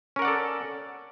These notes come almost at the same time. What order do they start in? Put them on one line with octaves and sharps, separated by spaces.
C#4 A#4 F#5 D5 A4